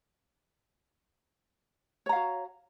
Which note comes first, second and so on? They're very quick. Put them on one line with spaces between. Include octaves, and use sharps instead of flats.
C#5 A#5 F5 F#4